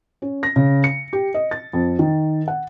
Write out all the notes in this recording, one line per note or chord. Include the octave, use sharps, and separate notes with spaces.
C#4
A#6
C#3
C#7
G4
D#5
A6
F2
D#3
F#5